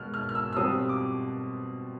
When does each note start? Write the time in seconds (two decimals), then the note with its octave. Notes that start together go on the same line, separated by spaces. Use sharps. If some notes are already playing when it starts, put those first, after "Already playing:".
Already playing: B2 G#3 B3 F6 F#6
0.14 F6
0.29 F6
0.35 E6
0.53 E6
0.56 B2 G3 C4 F4 D#6
0.89 D6